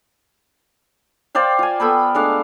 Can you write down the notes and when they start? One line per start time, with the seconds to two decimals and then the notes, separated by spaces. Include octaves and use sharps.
1.35 C5 D5 F5 G5
1.59 F4 G#5
1.80 B3 A4 G5 B5
2.15 G#3 A3 D4 F5